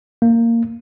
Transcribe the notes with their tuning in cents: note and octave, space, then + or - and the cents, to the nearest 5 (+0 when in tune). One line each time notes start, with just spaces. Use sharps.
A#3 -15